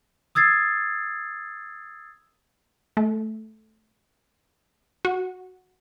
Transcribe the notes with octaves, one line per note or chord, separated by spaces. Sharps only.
D#6 E6 G#6 A6 C7
A3
F#4